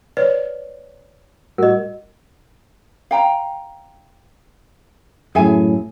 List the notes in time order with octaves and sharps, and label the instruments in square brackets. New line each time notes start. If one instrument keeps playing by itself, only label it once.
[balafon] B4 C#5 D5
[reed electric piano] A2 G3 F#4 [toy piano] A#4 D#5
[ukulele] F5 G5 A#5
[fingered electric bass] F#2 A2 [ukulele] G#4 E5 G#5